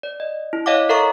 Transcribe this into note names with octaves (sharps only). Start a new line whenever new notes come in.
D5
D#5
E4
C#5 D#5 F5 F#5 D6
A4 A#4 E5 F5 A#5 C#6